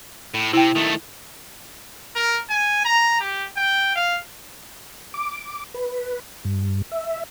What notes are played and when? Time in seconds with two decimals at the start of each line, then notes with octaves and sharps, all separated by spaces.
0.34 A2
0.53 C3 E4 G5
0.76 D#3 A3
2.15 A#4
2.50 G#5
2.85 A#5
3.20 G4
3.56 G5
3.96 F5
5.14 D6
5.74 B4
6.45 G2
6.91 E5